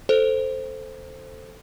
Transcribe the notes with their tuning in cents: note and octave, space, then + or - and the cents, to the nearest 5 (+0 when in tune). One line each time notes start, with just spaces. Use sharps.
A4 +0 C5 +0